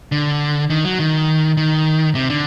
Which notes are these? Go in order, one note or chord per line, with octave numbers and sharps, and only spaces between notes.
D3
D#3
F#3
D#3
D#3
C3
D3